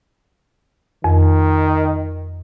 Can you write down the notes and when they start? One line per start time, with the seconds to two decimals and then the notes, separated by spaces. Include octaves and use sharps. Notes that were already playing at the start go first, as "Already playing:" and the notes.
1.04 F2 D#3